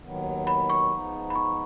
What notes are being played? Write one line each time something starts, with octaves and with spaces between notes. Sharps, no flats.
D#2 D#3 F#3 B3
B5
C#6
G#2 F3 B3 D#4
B5
C#6